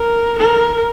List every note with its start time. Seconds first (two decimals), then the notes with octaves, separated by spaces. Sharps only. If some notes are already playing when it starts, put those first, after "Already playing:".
Already playing: A#4
0.39 A#4